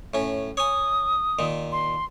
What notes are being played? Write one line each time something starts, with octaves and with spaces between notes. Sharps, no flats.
A2 C#4
C#5 G#5 D#6
A#2 D#3
C6